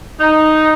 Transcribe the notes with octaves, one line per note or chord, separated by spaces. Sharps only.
D#4